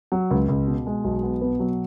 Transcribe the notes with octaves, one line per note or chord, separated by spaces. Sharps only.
F#3
C#2
C#2
B2
G#3
B1
B3
B2 B4
F#3